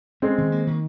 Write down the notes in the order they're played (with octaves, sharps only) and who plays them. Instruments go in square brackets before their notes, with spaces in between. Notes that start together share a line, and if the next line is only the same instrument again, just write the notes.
[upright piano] G#3 C4 [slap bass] C#4
[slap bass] D#3
A#3
D#3